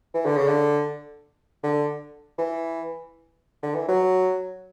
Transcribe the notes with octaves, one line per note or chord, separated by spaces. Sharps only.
E3
D3
C#3
D3
D3
E3
D3
E3
F#3